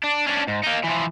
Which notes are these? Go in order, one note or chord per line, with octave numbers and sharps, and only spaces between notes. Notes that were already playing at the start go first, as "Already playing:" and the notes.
D4
C#4 D4
G#2
A#3 D#4
E3 F3